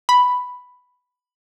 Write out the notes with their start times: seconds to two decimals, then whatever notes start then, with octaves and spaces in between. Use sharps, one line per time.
0.09 B5